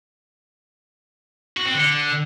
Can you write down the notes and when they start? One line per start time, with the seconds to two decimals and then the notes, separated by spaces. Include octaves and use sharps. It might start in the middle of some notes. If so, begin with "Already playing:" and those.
1.57 F#4
1.66 C4
1.74 D3